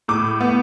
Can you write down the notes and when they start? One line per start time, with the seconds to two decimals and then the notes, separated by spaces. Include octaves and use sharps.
0.08 A2 D6
0.41 B3